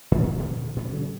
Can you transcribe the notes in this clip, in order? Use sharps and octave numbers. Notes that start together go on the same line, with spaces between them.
A2 D#3
A#2 D3 F3
A#2 C#3 G3 A3
C#3 F#3 G#3 C#4